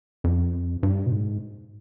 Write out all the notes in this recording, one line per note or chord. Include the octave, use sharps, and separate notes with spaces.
F2
G2
B2
G#2